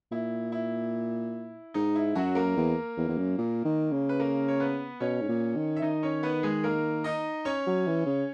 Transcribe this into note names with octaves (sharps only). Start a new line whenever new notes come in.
A#2 E4
E4
G#2 D#4
E4
F#2 F#3 F#4
A#3 A#4
E2
E2
E2
F#2
A#2
D#3
C#3
B4
A#3 A#4
C#5
B3 B4
B2 C#4 C#5
G#2
A#2
D#3
E5
D#3 D#4 D#5
C#4 C#5
B3 B4
G#3 G#4
A#3 A#4
D#4 D#5
C#4 C#5
F#3
E3
C#3